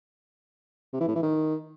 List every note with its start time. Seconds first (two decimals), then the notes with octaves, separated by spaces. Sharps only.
0.93 C3
1.00 E3
1.08 A2
1.15 E3
1.23 D#3